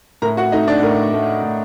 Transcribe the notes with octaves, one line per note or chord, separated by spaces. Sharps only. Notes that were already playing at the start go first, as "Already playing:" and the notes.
A2 A#4 A#5
F#4 F#5
A3 D#4 D#5
D4 D5
A2 A#4
A3
A2